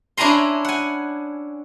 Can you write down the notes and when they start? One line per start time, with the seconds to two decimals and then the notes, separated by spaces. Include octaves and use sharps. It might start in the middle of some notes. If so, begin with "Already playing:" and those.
0.17 C#4 D4 E4 G#5 A#5 C6
0.65 F#5 G#5